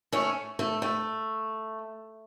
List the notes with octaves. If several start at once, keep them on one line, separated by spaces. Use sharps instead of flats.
A3 C#4
A3
A3